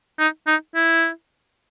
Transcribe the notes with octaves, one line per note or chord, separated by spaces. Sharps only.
D#4
D#4
E4